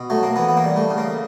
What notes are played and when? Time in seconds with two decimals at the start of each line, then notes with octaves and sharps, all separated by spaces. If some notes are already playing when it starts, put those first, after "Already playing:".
Already playing: B2
0.10 F#3 A3
0.23 A#3
0.36 E3 B3
0.48 B3
0.57 A#3
0.64 G3
0.76 A3
0.90 C#3
0.98 A#3